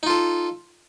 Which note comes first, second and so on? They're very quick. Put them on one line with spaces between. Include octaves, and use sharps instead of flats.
D#4 F4 A4